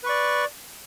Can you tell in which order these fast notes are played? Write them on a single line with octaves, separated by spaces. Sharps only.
B4 C#6 D5